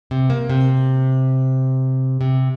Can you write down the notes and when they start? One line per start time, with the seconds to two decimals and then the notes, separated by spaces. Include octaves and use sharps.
0.11 C3
0.30 A#3
0.50 C3
2.21 C3